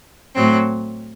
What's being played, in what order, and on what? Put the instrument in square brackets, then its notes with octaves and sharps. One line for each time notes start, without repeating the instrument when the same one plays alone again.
[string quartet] A2 F#3 C4